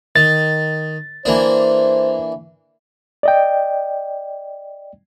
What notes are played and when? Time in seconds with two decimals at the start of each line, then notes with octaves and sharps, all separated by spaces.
0.16 D#3 A6
1.25 E3 A#3 D4 C5
3.23 D5 D#5 G5